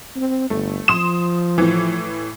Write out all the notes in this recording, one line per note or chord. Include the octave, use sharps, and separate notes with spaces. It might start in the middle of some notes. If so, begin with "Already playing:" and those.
C4
G1 A3
F3 C6 D#6 E7
A2 E3